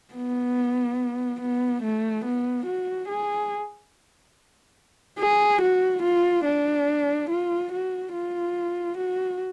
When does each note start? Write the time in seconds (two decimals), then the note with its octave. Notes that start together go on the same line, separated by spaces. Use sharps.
0.15 B3
1.41 B3
1.83 A3
2.25 B3
2.66 F#4
3.09 G#4
5.19 G#4
5.62 F#4
6.03 F4
6.45 D4
7.30 F4
7.72 F#4
8.13 F4
8.98 F#4